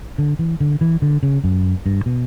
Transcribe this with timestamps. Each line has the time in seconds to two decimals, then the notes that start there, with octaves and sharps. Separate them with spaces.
0.18 D3
0.39 E3
0.60 D3
0.81 E3
1.02 D3
1.23 C#3
1.44 F#2
1.86 G2
2.06 B2